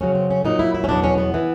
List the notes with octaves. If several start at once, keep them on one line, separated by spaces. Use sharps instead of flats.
F#2 C#3 F#3 C#4
C4
C#4
A#2 F#3 D#4
E4
E4
C#4
E2 B2 F#3 D4
C#4
B3
E3